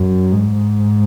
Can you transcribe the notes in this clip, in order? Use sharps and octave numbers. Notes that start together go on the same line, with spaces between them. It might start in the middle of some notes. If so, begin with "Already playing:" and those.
Already playing: F#2
G#2